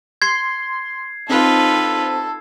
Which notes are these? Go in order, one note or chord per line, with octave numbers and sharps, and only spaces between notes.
C6 G#6 C7
C4 D#4 F4 A4 B4